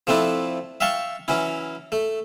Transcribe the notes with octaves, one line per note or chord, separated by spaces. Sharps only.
F3 A3 C4 D4 E4
E5 F5 G5 A5 C#6
E3 F#3 C#4 E4
A3